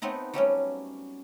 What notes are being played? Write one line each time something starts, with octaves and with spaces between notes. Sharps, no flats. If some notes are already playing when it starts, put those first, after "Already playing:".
A3 B3 C4 D#4
F#3 G3 A3 C#4